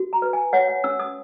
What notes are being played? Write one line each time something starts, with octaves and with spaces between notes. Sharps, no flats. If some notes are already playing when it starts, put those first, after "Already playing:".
Already playing: F#4
A#5
B4
G#5
C#5 F#5
F#5
C#4 E6
D#6